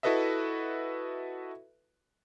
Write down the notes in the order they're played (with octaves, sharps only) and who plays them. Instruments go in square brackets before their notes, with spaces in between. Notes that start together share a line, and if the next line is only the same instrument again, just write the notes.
[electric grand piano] E4 F#4 A4 B4 D#5 E5